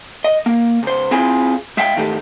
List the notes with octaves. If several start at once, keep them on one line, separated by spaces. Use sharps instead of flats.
D#5
A#3
C#2 C5
C4 E4 F4 G#4 G#5
G#3 E5 F5 G5
G#2 D#3 A3 G4